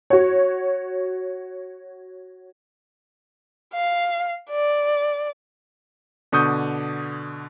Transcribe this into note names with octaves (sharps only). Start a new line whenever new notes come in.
F#4 C#5
F5
D5
B2 D3 C#6 D#6 G6